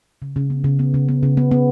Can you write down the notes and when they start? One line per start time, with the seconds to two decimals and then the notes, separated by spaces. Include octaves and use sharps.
0.22 C#3
0.36 C#3
0.50 B3
0.64 C#3
0.79 B3
0.94 C#3
1.08 B3
1.23 C#3
1.37 B3
1.51 B3